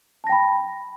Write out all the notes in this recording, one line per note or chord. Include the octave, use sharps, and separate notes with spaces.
G5 A5 B5 A#6